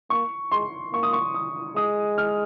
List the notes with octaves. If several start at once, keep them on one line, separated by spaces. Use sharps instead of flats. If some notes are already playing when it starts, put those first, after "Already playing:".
A#3 C#6
G#3 C6
A#3 C#6
D#6
C#6
D#6
G#3 D#6
F6